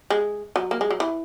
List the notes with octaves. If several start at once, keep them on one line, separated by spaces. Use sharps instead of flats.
G#3
F#3
A#3
G#3
F#3
E3